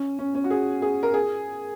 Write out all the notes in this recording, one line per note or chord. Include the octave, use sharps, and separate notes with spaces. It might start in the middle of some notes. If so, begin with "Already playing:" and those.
Already playing: C#4
C#4
C#4
F#4
G#4
G#4
A#4
G#4